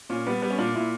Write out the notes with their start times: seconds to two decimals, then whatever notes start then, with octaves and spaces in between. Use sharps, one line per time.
0.09 A#2 C#4
0.27 G3 B3
0.42 G3 B3
0.50 C#4
0.58 A#2 D4
0.75 A#2 E4